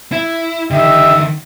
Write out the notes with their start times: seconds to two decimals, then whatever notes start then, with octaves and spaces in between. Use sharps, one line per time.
0.12 E4
0.71 D3 D#3 G4 D#5 E5